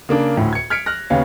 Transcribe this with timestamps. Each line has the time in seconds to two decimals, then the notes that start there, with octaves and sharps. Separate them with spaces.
0.09 C#3 A#3 D4
0.37 D2 A2
0.53 G#6 C#7
0.70 F6 G#6 B6 C#7 D7
0.86 F6 F#6 A#6
1.10 D#2 C#3 B3 C#5 F5